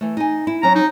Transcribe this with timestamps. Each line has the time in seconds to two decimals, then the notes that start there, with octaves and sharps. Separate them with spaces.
0.01 E3 A3
0.17 D#4 G#5
0.47 E4
0.63 F#3 C#4 A#5
0.76 D#4